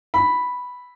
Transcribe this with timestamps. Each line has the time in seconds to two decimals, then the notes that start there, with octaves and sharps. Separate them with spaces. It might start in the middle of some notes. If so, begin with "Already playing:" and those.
0.14 B5